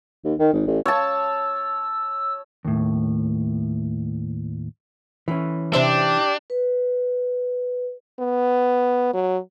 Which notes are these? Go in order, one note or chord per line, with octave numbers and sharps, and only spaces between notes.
D#2
D#3
G#1
A1
C#5 A5 E6
D#2 A2
E3 C#4
C3 D4 G4 C5 E5
B4
B3
F#3